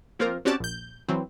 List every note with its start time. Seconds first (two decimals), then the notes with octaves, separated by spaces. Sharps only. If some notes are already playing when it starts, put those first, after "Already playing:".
0.19 F3 A#3 C4 F4 A#4
0.45 C4 C#4 F#4 G4 D5 A5
0.60 A#1 G6
1.08 E3 F#3 C4